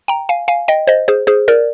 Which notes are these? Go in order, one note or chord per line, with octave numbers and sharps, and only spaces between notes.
G5 A#5
F5 G#5
F5 G#5
D#5 G5
C5 D#5
G#4 C5
G#4 C5
A#4 D5